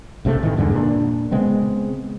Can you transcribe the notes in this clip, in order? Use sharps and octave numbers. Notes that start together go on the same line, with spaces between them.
A#1 C3 F3 A3
A2 D#3 E3
E2 G2 D3 G#3
A#2 D4
C#3 G#3 B3 C4